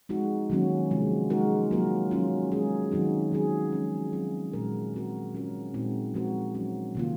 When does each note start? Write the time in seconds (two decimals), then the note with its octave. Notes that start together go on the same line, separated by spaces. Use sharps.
0.09 F3 G#3 C4 D#4 F#4
0.50 D#3 F#3 A#3 C#4 F#4
0.91 C3 F3 G#3
1.30 G#3 D#4 F#4 A#4
1.71 F#3 A#3 F4 A#4
2.11 F#3 C#4 F4
2.52 G#3 C#4 G#4
2.91 D#3 F#3 C4 D#4 F#4
3.32 D#3 F#3 C#4 G#4
3.72 F3 G#3 C#4
4.13 F#3 C4 F4
4.53 A#2 G#3 C#4 F#4 A#4
4.93 G#3 C4 F#4 A#4
5.34 G#3 C#4 F4 A#4
5.74 A#2 G#3 C4 D#4 F#4
6.14 F3 G#3 C4 F#4 A#4
6.55 F#3 C#4 F#4
6.95 C3 D#3 A#3 F4